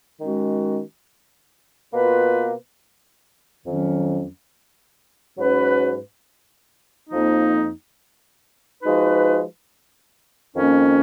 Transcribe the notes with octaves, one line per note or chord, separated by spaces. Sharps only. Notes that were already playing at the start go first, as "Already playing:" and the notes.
D#3 G#3 C#4 F#4
B2 A#3 F4 B4
F2 D#3 F#3 C#4
G#2 F#3 C#4 F#4 B4
F2 F3 A#3 D#4
F3 G#3 D#4 F#4 B4
F2 D#3 A#3 C#4